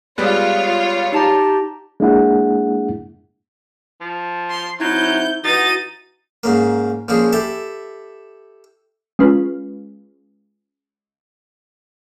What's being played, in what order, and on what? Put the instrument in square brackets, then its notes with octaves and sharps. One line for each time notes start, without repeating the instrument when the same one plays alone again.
[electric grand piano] G3 G#3 B3 [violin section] F4 C#5 [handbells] F#6
[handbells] D#4 A5 A#5 [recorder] G4
[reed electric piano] G#3 A#3 D4 E4 G#4 F#5
[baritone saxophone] F3
[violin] C6
[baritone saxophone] F#3 [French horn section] C4 D#4 E4 [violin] G6
[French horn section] E3 F#4 [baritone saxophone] D#4 [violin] A6 D#7
[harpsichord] G#2 C#3 A#3
A#1 C#3 F3 G#4
E4 G4 A4 E5
[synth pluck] G#3 C#4 F4 B4